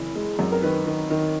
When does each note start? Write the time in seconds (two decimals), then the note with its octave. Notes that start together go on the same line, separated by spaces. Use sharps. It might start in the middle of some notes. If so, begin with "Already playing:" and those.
Already playing: F#1 E3
0.16 G#3
0.39 F#2
0.52 A#4
0.62 D#3 B4
0.86 D#3
1.10 D#3